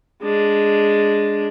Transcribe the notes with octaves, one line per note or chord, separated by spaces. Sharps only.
G#3 D4